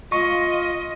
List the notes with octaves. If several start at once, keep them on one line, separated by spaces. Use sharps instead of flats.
F4 D#5 C#6